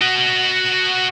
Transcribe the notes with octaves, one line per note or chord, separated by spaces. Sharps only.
F#4 D#5